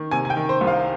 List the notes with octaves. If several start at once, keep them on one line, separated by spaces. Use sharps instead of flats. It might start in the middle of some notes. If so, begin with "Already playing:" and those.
Already playing: D#3
C3 G#5
G#5
G5
D#3
C5
C2
F5